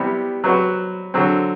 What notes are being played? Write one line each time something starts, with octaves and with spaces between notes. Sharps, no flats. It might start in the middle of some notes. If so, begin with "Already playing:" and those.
Already playing: C3 G3 B3 E4
F#3 C4 F#4 B4
D3 F#3 C4